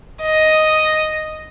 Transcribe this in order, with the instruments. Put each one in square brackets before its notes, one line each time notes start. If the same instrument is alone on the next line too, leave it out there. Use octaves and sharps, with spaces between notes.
[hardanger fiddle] D#5